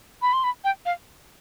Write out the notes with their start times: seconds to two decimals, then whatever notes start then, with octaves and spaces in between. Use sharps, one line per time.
0.22 B5
0.33 C6
0.44 B5
0.64 G5
0.86 F5